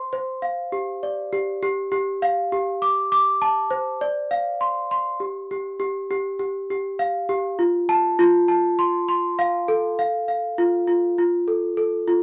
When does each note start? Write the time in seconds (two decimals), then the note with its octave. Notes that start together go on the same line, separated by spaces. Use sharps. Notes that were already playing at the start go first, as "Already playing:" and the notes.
Already playing: C5 C6
0.13 C5
0.42 F5
0.72 G4
1.03 D5
1.33 G4
1.63 G4
1.92 G4
2.22 F5
2.52 G4
2.82 D6
3.12 D6
3.42 A5
3.71 C5
4.01 D5
4.31 F5
4.61 C6
4.91 C6
5.20 G4
5.51 G4
5.80 G4
6.11 G4
6.39 G4
6.70 G4
6.99 F5
7.29 G4
7.59 F4
7.89 A5
8.19 F4
8.48 A5
8.79 C6
9.08 C6
9.39 F5
9.68 A4
9.99 F5
10.28 F5
10.58 F4
10.88 F4
11.18 F4
11.48 A4
11.77 A4
12.08 F4